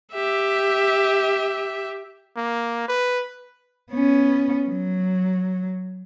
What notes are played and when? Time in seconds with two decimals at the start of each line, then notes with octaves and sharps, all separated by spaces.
0.13 G4 E5
2.36 A#3
2.88 B4
3.92 B3 C#4
4.68 F#3